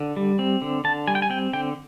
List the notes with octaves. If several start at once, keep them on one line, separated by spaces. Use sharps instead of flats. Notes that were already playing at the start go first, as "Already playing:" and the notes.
Already playing: D3
G3
C4
D3
D3 A5
G3 G#5
G5
G#5
C4 G5
D3 G5